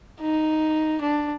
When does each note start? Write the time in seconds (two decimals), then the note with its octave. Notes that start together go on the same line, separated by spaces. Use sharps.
0.21 D#4
1.02 D4